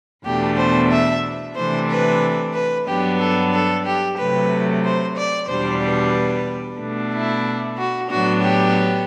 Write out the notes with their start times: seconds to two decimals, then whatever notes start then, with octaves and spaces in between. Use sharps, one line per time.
0.25 E2 B2 A3 D4 G4
0.58 C5
0.91 E5
1.55 C3 E3 A3 D4 C5
1.89 B4
2.53 B4
2.87 G2 F#3 B3 D4 G4
3.19 A4
3.52 A4
3.85 G4
4.17 C3 F#3 A3 B4
4.83 C5
5.16 D5
5.48 E2 B2 G3 D4 C5
5.81 B4
6.79 B2 A3 D4
7.12 E4
7.77 F#4
8.09 A2 F#3 B3 D4 F#4
8.42 G4